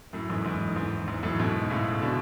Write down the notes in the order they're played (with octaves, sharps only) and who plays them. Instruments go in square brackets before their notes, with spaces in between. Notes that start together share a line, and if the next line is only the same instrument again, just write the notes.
[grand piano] F#2 A2
E2 G#2
E2 G#2
E2 G#2
E2 G#2
F#2 A2
G#2 B2
A2 C#3
B2 D3